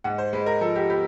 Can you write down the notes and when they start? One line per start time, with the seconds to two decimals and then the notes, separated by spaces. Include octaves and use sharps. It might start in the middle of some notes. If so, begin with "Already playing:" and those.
0.04 G#2 F#5
0.18 C5
0.33 G#3 B4
0.46 A#4
0.61 F3 A4
0.75 G4
0.90 B3 G4